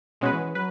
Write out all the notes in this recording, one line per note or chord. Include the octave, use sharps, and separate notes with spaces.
B2 G#3 C#4 F#4 B4
E3
E3
F#3 B4